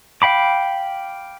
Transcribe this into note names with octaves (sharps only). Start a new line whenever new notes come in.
F5 G5 B5 D6